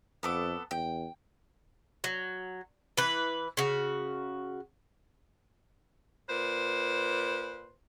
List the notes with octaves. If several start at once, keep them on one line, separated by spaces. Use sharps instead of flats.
F2 B3 A4 D6
E2 G5
F#3
E3 B4
C#3 F#4
A#2 B4 C5